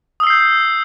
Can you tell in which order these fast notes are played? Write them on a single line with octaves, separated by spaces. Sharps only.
D#6 E6 C7 G6